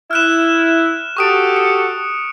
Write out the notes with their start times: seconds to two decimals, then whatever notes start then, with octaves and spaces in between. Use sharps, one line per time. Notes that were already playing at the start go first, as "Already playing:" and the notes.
0.11 E4 F6 F#6 E7
1.17 F#4 G4 A4 C#6 D#6 D7
1.57 C#7